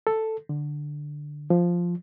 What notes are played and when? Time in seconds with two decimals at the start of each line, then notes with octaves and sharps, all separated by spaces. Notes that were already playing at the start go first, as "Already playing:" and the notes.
0.07 A4
0.49 D3
1.50 F3